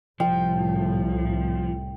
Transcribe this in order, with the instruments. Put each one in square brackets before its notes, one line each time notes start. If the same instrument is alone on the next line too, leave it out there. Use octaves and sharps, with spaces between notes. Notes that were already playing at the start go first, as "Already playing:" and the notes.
[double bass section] C2 A2 [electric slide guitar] F3 [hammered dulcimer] G5